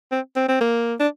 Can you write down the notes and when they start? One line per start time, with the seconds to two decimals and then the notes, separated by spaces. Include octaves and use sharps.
0.12 C4
0.36 C4
0.48 C4
0.61 A#3
1.00 D4